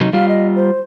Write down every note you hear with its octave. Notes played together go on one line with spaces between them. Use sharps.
C3 F#3 D#4
G3 F4 F5
D#5
C5